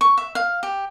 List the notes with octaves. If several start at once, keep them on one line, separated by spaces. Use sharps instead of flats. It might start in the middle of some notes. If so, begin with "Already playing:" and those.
C#6
E5
F5
G4